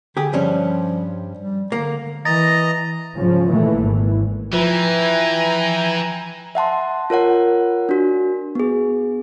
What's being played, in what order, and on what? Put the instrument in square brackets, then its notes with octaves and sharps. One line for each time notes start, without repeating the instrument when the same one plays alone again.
[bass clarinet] D3 [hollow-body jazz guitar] G4 G#4
[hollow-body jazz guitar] G2 G3 C#4 [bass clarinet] F3
[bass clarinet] G3
[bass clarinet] D3 [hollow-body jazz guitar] A#3
[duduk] E3 [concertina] D#5 A#5 [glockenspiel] A6 A#6
[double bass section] G#2 C#3 F3 C#4
A#1 D#3 E3 A3 A#3
G#1 E3
[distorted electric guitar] E3 [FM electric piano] F3 B4 [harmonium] E4 E5 [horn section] G5 G#5 A#5
[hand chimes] E5 F#5 A5 C6
F4 A#4 C#5 F#5
D4 F#4
B3 G#4